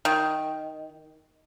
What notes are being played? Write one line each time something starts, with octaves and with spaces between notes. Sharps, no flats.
D#3